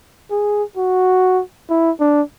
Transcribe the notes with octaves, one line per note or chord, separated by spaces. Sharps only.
G#4
F#4
E4
D4